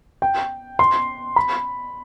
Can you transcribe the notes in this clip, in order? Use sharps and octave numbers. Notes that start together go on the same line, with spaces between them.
G5
C6
B5